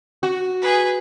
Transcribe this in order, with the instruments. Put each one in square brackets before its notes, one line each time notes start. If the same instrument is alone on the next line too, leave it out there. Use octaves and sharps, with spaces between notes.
[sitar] F#4
[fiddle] G#4 B4